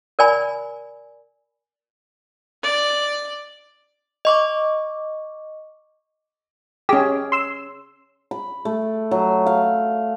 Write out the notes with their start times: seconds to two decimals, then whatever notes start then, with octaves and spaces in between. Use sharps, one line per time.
0.19 A#4 D5 G#5 B5
2.63 D5
4.25 D#5 C#6 D6
6.89 C#4 G4 G#4
7.32 C6 E6
8.31 B5
8.65 A3
9.11 F#3
9.46 F5